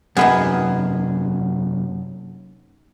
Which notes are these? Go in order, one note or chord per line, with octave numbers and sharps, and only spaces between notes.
F#2 C3 D#3 F#3 A#3 B3 G#4